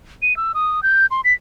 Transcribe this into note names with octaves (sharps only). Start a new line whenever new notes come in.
D#7
E6
D#6
G6
C6
B6